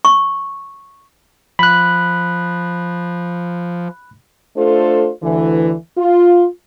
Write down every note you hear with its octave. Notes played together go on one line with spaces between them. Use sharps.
C#6
F3 B5 F#6
A3 D4 F4 A4 C5
D2 D3 E3
F4